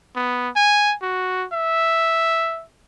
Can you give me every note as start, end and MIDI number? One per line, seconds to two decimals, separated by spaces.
0.16 0.49 59
0.56 0.95 80
1.02 1.46 66
1.53 2.64 76